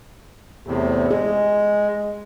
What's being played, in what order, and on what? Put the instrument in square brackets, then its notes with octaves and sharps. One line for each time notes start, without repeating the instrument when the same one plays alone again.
[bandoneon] E2 A2 C3
[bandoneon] G#3 [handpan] G#4